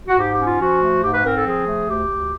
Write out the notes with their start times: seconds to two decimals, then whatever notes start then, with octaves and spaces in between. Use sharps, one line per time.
0.08 F#4
0.18 G#2 G4
0.33 G4
0.39 C#4
0.46 F4
0.60 F3 F#4
0.81 A3
1.03 G#2 G4
1.13 B4
1.24 C4 A#4
1.34 A4
1.45 F3 G#4
1.66 A3
1.87 D2 G4
2.09 D2